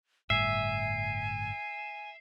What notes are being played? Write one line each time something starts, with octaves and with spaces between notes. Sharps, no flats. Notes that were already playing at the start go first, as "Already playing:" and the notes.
G1 A2 G3 E5 G#5 C7